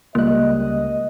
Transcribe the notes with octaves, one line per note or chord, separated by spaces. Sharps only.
C#2 G3 A#3 D#5 F#6